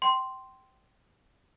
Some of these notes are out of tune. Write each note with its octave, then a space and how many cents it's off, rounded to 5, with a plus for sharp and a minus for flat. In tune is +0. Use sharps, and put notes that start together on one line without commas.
G5 -20 C6 +0